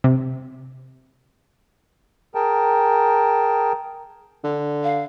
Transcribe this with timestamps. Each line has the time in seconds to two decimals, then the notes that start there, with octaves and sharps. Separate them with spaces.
0.04 C3
2.35 G#4 A#4 G5 A5
4.44 D3
4.84 F5